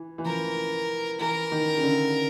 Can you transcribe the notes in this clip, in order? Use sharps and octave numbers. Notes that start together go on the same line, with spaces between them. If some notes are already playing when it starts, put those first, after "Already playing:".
Already playing: E3
E3
F3 A#4
E3 A#4
D#3
C#3
D3